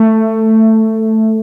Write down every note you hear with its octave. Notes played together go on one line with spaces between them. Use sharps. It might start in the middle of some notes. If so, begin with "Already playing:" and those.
Already playing: A3